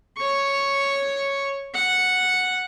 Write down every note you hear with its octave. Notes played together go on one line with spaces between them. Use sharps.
C#5 C#6
F#5